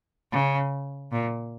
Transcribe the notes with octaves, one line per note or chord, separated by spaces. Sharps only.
C#3
A#2